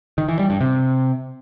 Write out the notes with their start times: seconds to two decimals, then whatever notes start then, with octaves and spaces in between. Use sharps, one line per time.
0.18 D#3
0.28 E3
0.39 G3
0.50 G2
0.61 C3